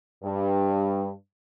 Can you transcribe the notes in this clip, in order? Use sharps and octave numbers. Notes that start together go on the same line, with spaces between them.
G2